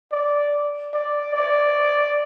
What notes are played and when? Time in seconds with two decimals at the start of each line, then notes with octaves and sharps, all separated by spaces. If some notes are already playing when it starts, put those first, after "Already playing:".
0.12 D5
0.94 D5
1.34 D5